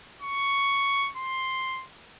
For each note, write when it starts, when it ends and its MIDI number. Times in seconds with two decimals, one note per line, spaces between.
0.21 1.10 85
1.17 1.85 84